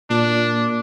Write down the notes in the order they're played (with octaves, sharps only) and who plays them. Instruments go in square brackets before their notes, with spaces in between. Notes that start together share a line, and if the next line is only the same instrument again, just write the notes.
[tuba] A#2 [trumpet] D4